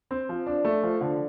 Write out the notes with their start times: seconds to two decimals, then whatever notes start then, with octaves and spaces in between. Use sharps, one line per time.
0.11 C4
0.29 F3
0.46 D4
0.65 A3
0.83 F3
1.01 D3